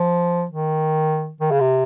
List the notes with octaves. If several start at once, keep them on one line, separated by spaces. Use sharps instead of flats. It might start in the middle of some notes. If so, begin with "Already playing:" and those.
Already playing: F3
D#3
D#3
C#3
C3